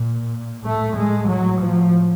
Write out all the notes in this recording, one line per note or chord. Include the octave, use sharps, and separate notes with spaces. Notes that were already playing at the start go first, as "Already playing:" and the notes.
Already playing: A#2
A2 A3
G#3
F#3
F3